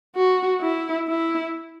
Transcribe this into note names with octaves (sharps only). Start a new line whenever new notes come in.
F#4
E4
E4